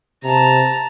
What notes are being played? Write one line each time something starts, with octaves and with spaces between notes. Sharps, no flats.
C3 A5 A#5